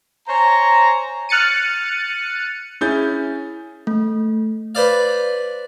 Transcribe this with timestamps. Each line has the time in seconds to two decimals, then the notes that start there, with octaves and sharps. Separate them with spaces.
0.28 C5 C#5 G#5 A#5
1.29 F6 F#6 A6 C#7 D#7
2.81 C#4 E4 G#4 G6 A6
3.87 A3
4.75 B4 C5 D5 F5